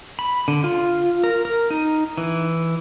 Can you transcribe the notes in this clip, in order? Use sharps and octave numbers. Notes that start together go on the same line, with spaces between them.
B5
D3
F4
A#4
A#4
D#4
E3